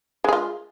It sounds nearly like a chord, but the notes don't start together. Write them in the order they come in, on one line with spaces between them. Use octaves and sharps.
G#3 G#4 F4